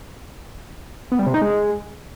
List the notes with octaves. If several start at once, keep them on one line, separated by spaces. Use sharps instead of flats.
B3
G3
C3
D#4
G#3